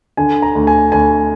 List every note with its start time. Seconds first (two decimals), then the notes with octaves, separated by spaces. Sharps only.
0.17 D3 G#5
0.42 A#5
0.55 D2
0.67 G#5
0.92 D2 G#5